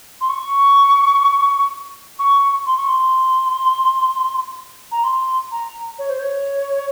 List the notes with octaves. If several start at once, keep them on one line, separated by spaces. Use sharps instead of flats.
C6
C#6
C#6
C6
C#6
C6
A#5
C6
A#5
C#5
C5
C#5